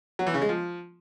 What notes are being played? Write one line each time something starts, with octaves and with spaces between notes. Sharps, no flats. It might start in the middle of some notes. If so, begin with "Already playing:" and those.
F#3
E3
C#3
G#3
F3